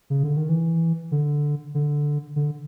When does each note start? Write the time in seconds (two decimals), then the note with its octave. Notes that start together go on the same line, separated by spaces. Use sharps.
0.10 C#3
0.24 D3
0.37 D#3
0.49 E3
1.11 D3
1.75 D3
2.36 D3